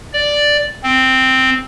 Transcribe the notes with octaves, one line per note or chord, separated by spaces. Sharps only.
D5
C4